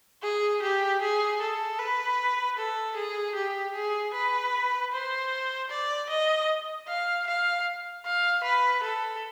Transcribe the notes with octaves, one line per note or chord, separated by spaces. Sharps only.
G#4
G4
G#4
A4
B4
A4
G#4
G4
G#4
B4
C5
D5
D#5
F5
F5
F5
B4
A4